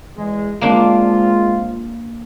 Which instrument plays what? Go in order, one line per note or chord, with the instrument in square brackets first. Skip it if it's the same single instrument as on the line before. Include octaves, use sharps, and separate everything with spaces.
[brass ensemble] E2 G#3
[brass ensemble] G#3 C4 F4 [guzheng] A#3 D4